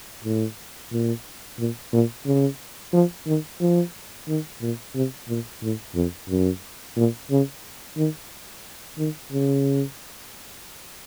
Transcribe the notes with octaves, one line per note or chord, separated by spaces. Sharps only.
A2
A#2
A#2
A#2
C#3
F3
D#3
F3
D#3
A#2
C3
A#2
A2
F2
F#2
A#2
C#3
D#3
D#3
C#3